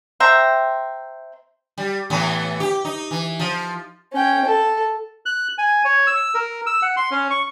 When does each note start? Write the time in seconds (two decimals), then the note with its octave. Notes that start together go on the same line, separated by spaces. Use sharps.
0.20 C5 E5 G5 A#5
1.78 G3
2.10 A2 E3 B3
2.60 G4
2.85 D#4
3.11 E3
3.39 F3
4.13 C#4 G5
4.45 A4
5.26 F#6
5.58 G#5
5.85 C#5
6.07 E6
6.34 A#4
6.66 E6
6.82 F#5
6.97 C6
7.11 C#4
7.30 C#6